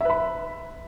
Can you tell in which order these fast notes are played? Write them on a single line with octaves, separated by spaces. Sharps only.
E5 B4 B5